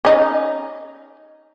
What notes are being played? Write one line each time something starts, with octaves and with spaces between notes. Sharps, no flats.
C#4 D#4